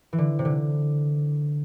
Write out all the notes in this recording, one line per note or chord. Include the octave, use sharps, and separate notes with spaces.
E3
D3
C3
D3